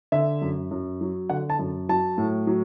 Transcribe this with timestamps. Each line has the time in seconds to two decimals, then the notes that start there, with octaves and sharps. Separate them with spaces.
0.12 D3 E5
0.42 F#2
0.71 F#2
1.01 F#3
1.30 D3 F#5
1.50 A5
1.59 F#2
1.89 F#3 A5
2.18 A2
2.47 F#3